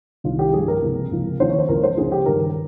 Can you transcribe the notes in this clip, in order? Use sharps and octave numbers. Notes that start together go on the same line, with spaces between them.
C2 C3 D#3 F4
G4
G2 F3 G#4
A#4
C#2 C3 F3
C#2 C3 F3
D#2 C#3 F3 C5
C#5
C5
C#2 C#3 F3 A#4
C5
C#2 C#3 F3 G#4
G4
G2 D#3 A#4